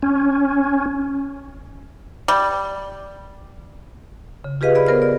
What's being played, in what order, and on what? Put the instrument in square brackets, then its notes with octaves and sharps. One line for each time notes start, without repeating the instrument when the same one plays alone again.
[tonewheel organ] C#4
[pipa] G3
[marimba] C#3
F4 G4 G#4 B4 D#5 F5
G#4 D5 D#5 B5
B3 A#4 C5 F6
D5